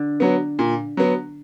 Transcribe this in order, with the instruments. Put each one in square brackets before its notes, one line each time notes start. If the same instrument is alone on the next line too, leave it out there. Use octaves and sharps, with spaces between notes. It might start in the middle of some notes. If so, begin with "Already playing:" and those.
Already playing: [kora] D3
[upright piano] F#3 B3
A#2
F#3 B3